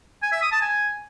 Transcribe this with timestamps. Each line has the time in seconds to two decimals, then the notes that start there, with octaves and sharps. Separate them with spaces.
0.23 G#5
0.32 E5
0.42 D#6
0.52 A5
0.62 G#5